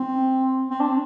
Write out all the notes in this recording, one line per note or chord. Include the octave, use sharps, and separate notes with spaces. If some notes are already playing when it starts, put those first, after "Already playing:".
Already playing: C4
C4
D4